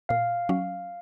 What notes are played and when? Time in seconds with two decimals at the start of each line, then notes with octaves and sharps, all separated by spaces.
0.09 A#2 F5
0.49 F#3 C#4